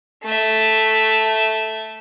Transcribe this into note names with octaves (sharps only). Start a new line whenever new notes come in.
A3 E5